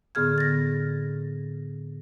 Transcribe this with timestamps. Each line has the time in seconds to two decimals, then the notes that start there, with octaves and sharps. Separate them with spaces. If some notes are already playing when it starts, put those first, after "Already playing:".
0.15 A2 D3 B3 G#4 F6 G#6
0.38 A6 A#6